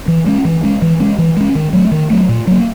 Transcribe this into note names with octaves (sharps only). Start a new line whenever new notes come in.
E3
G#3 C#4
E3
G#3 C#4
E3
G#3 C#4
E3
G#3 C#4
D#3
F#3 A3
D#3
F#3 A3
A#2
F#3 A#3